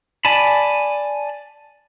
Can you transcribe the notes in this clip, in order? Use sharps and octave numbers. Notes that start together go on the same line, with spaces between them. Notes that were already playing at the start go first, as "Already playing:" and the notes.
D5 G#5 A5 B5